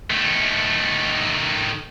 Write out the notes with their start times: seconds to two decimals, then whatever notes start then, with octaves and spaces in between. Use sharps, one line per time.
0.10 D#3 A3